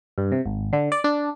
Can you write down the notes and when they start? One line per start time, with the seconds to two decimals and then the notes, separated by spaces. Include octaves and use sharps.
0.18 G2
0.32 C3
0.46 G#1
0.73 D3
0.92 D5
1.04 D4